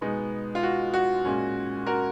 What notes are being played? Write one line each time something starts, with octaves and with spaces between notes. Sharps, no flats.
B2 G#3 B3 D#4
F4
F#4
F#4
A#2 G#3 C#4
F#4 A#4